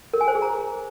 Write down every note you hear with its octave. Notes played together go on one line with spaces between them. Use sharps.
A#4
G#5
C5
G#4
A#5